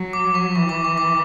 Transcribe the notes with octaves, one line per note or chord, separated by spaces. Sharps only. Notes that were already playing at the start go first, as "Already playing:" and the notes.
Already playing: F#3
D6
C#6
E3 C#6
D6
C#6
D6